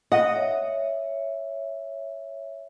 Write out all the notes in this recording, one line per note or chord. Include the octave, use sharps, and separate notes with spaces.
D#5 F#5
C#5 E5